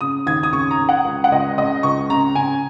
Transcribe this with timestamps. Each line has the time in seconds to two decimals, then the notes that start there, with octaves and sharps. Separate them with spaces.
0.01 C#3 D#6
0.27 D#2 G#6
0.43 D#6
0.53 C#3 C#6
0.71 A#5
0.79 C#3
0.89 F#5
1.05 C#2
1.24 F#5
1.32 C#2 D#5
1.57 C#3 D#5
1.83 C#2 C#6
2.10 C#3 A#5
2.35 C#3 G#5